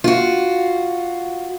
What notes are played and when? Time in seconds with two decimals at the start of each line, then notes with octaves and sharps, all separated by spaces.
0.04 F4 F#4